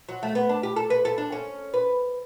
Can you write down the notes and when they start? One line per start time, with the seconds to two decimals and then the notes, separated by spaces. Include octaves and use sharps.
0.09 F#3
0.23 A3
0.35 B3
0.49 D4
0.63 G4
0.76 A4
0.90 B4
1.05 A4
1.18 D4
1.32 C#4
1.74 B4